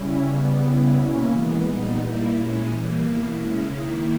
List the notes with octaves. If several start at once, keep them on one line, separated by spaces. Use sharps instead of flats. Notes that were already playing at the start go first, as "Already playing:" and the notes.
Already playing: C#3 G3 C#4 E4
C#3 G3 B3
C#3 G3 B3 E4
B2 A#3 C#4 E4
E3 G#3 B3
A#2 G3 B3 D#4
G3 A#3 E4
A#2 G#3 C#4 E4
E3 G3 A#3
B2 A#3 E4
C#3 G#3 C#4 E4
D#3 A#3 E4